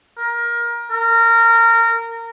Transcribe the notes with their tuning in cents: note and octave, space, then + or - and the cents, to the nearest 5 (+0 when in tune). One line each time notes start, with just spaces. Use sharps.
A#4 +20
A#4 -20